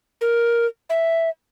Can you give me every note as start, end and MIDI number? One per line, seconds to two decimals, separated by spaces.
0.21 0.66 70
0.90 1.30 76